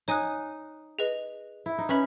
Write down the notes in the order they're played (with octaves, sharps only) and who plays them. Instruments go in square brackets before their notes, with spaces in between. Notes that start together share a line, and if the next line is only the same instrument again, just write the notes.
[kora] D#4 [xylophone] C#5 G#5 D#6 F#6
[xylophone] G#4 B4 D#5
[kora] E4
D#4
[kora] C#4 [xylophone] B4 E5 B5